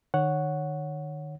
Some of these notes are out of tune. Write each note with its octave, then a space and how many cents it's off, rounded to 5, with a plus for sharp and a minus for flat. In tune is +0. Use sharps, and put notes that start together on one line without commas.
D#3 -35 C#5 +0 F#5 +0